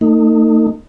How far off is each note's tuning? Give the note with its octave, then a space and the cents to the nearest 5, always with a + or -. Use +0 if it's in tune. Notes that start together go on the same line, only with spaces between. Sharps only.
A3 +45 D#4 +0